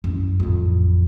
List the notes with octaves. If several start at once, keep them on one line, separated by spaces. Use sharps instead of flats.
F#2 E4
A1 F2